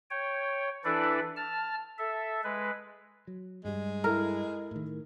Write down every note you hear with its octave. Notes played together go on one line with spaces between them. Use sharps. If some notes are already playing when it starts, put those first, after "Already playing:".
C#5 G5
E3 D4 E4 A4 B4 D5
A5 F6
A4 E5
G#3 B4
F#3
G2 G3 G#3
E4 A4 A#4
A2 D#3